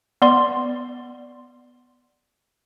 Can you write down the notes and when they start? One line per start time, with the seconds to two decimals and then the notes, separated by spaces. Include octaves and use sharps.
0.22 B3 D5 C6